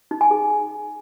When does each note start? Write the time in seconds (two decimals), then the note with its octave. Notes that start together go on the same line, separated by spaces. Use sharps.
0.11 D#4
0.21 G#5
0.31 G#4